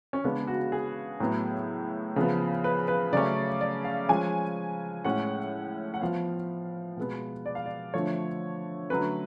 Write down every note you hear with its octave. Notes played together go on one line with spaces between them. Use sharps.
C#4
C#3 G#3 B3 D4
F#4
G#4
A2 F#3 B3
C#3 F3 B3
B4
B4
C#3 F#3 A3 C#4 D5
D5
F5
F3 G#3 C#4 G#5
A2 G#3 C#4 F#5
F#5
F3 B3 F5
B2 G#3 B3
D5
F5
D5
D3 F3 A3 C#5
D3 F#3 A3 C#4 B4